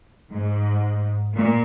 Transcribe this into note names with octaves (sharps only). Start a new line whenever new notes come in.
G#2
A#2